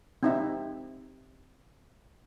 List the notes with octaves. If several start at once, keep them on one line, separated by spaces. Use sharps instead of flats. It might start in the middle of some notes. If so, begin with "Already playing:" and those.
C4 D#4 E5